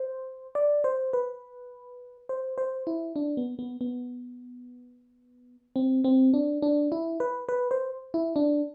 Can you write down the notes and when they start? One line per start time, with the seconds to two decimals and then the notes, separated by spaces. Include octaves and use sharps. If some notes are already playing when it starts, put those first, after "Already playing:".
Already playing: C5
0.55 D5
0.84 C5
1.13 B4
2.29 C5
2.58 C5
2.87 E4
3.16 D4
3.37 B3
3.59 B3
3.81 B3
5.76 C4
6.04 C4
6.34 D4
6.62 D4
6.92 E4
7.20 B4
7.49 B4
7.71 C5
8.14 E4
8.36 D4